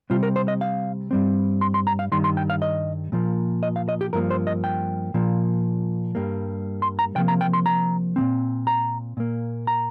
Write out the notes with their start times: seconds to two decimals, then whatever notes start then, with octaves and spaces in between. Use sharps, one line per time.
0.10 C3 G3 C4 F4
0.23 A#4
0.36 C5
0.48 D#5
0.61 F5
1.11 G2 G3 C4
1.61 C6
1.74 C6
1.87 A#5
1.99 F5
2.12 G2 D#3 G3 C6
2.24 C6
2.37 G5
2.50 F5
2.62 D#5
3.12 A#2 F3 A#3
3.63 D#5
3.76 F5
3.89 D#5
4.01 G4
4.13 G2 F3 A#3 A#4
4.30 C5
4.47 D#5
4.64 G5
5.14 A#2 F3 A#3
6.15 G2 G3 A#3
6.82 C6
6.99 A#5
7.16 C3 F3 A#3 G5
7.28 A#5
7.41 G5
7.53 C6
7.66 A#5
8.16 A#2 F3 C4
8.67 A#5
9.17 A#2 A#3
9.67 A#5